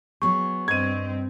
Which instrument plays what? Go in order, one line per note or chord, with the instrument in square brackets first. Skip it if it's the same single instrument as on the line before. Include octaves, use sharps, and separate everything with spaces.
[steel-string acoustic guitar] F#3 B3 G#4 [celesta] C#6
[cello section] G2 C4 [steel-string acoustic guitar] D#5 [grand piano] G#6 D#7